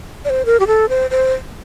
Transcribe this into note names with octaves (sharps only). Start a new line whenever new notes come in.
D5
C5
A#4
G4
A4
C5
C5